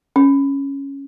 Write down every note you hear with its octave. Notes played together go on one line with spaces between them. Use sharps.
C#4